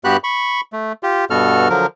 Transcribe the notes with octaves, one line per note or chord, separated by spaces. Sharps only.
G2 B3 F#4 G4 B5 F#6
B5 C#6
A3
F4 G4
G2 B2 B3 F#4 A4 F6
D3 F3 F#3 A#4